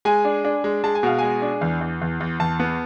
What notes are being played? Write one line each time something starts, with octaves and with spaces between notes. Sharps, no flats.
G#3 G#5
D4
D4
G#3
G#3 A5
G#5
B2 F5
G#3 G#5
D4
E2
E2
E2
E2
E2 A5
B3